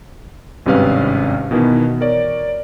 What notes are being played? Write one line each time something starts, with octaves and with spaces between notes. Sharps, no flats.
G#1 G2 C3 C#4 B4 F5
B2 D#3 E3 B3
A#4 C#5 D5